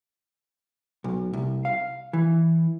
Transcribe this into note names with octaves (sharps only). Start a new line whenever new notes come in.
B1
C2
F5
E3